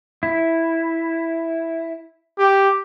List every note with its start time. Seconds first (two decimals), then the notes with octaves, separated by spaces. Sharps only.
0.23 E4
2.39 G4